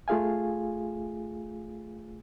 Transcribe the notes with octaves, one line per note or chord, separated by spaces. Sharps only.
A3 F4 G#4 F5 G#5